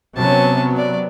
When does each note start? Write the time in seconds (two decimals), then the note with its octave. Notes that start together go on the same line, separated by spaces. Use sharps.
0.17 C3 F#3 B3 C#4 A5
0.77 D5